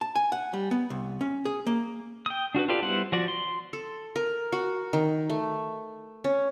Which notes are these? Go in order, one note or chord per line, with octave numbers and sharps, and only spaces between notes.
A5
G#5
F#5
G3
B3
C2
C#4
G#4
A#3
G5 D#6
D4 F#4 A#4 B4
F4 G4 A4 B4 D5
G3 B3 E4 C5 F#5
F3 F#4 D5
C6
A4
A#4
F#4
D#3
A3
C#4